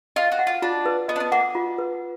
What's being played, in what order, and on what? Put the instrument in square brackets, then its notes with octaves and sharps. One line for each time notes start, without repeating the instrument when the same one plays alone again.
[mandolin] F4 [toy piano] D#5
[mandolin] F#4
[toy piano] F#5
[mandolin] F4
[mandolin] D4 [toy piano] F4
[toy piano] B4
[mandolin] B3 [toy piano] D#5
[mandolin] D4
B3
[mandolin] A#3 [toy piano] F#5
[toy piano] F4
B4